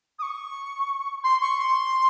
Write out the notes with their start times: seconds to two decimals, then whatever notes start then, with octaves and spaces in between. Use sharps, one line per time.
0.19 D#6
0.22 C#6
1.24 C6
1.41 C#6
1.58 C6